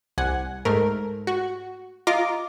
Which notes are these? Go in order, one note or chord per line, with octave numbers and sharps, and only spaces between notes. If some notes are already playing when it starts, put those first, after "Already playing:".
C2 F#5 G#5
G#2 A3 A#4
F#4
F4 D#5 A#5 D6